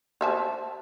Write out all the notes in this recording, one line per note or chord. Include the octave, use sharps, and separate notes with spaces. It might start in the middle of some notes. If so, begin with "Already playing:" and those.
C5 E5 A5